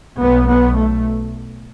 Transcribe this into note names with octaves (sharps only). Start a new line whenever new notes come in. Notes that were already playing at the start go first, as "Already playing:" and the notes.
B1 B2 B3
B3
A3